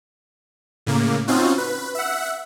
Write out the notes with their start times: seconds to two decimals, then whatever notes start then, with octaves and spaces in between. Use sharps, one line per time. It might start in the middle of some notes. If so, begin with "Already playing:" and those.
0.86 A2 C#3 A#3
1.28 C4 C#4 D#4 F4 F#4
1.58 B4
1.95 E5 F#5